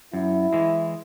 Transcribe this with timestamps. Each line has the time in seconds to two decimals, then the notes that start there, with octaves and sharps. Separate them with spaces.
0.13 F#2 E4
0.53 E3 G#3